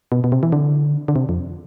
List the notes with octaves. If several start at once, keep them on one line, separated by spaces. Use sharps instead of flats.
B2
B2
C3
E3
D3
D3
C3
F2